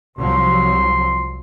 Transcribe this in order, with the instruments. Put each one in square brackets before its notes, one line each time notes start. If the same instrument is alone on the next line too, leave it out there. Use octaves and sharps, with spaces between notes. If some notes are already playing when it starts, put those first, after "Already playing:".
[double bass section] C2 F3 F#3 [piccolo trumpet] C6